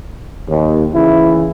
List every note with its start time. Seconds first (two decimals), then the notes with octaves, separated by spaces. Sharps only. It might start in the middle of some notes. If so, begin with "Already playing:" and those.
0.49 D#2
0.94 C#3 E3 E4